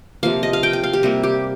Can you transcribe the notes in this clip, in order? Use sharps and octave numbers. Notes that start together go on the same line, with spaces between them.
C3 F3 A#3 F5
D#5
F5
G5
G5
F5
G4
C3 G3 A#3
G4